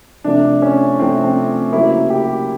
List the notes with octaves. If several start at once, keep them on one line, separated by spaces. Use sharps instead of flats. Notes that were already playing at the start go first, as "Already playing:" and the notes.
C3 F3 A3 D4
C#4
C3 F3 A3 C4
C4
C#3 F#3 A#3 E4
G4